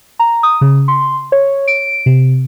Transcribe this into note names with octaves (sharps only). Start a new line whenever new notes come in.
A#5
D#6
C#3
C6
C#5
D7
C3